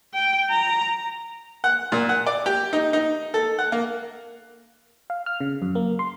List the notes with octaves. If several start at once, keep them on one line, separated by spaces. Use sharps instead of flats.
G5
A#5
F#5
A#2
F#5
D5
G4
D#4
D#4
A4
F#5
A#3
F5
F6
C#3
F#2
A#3
C6